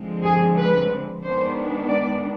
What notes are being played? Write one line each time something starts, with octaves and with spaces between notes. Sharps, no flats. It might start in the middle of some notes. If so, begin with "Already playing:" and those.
Already playing: D3 F3 G#3 C4
G#4
B4
D#3 G#3 B3 D4 C5
D5